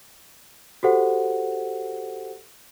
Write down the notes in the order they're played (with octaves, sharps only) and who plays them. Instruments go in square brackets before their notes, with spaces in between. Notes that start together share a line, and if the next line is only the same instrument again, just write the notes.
[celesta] F#4 G4 A4 C5 F#5